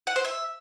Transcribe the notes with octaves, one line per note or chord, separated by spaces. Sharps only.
F#5
C5
E5